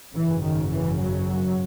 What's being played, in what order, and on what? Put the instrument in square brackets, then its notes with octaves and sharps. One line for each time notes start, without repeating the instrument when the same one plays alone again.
[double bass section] G#1 F#2 C#3 E3
D#3
E3
F#3